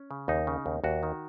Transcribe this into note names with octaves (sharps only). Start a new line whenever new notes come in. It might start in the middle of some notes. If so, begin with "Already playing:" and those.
Already playing: C#4
C#3
D#2 D#4
C#3
D#2
D#2 F#4
D#3